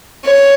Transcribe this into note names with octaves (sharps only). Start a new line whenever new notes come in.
C#5